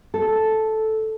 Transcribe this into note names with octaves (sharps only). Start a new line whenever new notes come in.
A4